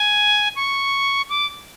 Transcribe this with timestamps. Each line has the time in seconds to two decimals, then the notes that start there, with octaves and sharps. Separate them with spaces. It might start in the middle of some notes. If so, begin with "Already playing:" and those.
Already playing: G#5
0.56 C#6
1.30 D6